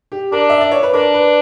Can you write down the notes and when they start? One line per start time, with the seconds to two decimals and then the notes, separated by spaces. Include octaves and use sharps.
0.12 G4
0.32 D4 A#4
0.50 E5
0.61 D5
0.72 C#5
0.83 B4
0.94 D4 A#4
1.14 B4